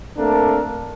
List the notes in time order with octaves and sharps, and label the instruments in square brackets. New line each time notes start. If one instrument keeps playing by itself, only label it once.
[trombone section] A3 A#3 C4 D4 A4 A#4